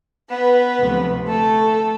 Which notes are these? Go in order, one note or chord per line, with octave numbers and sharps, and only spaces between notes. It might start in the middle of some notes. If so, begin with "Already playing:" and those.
B3 B4
D2 C3 F3 A3
A3 A4